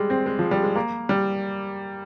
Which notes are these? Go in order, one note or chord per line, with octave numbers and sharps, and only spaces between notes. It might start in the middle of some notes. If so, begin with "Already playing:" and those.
Already playing: G3 G#3
C4
G#3
F3
G3
G#3
A#3
G3